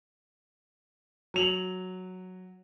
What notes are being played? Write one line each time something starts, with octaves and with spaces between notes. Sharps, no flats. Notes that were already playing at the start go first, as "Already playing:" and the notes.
F#3 F7 F#7